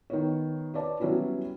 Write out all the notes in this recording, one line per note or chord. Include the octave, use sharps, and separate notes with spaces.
D#3 B3 C#5
B4 C#5 D5 A5
F#3 G3 B3 C#4 E4 F#4